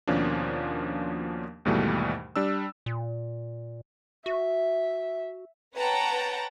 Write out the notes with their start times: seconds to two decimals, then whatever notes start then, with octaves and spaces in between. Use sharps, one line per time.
0.07 D#2 B2 F3 A#3 C#4 D4
1.65 D#2 G#2 B2 E3 G3 A3
2.36 G3 D4 E6
2.86 A#2
4.26 F#4 E5
5.75 B4 C#5 F#5 G5 A5 A#5